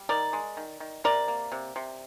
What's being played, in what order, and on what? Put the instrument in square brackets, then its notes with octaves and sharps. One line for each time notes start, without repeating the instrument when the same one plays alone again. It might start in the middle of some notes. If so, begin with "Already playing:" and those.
Already playing: [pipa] G3
D#3 A#4 D5
G#3
D#3
D#3
C3 A#4 D5
A#3
C3
C3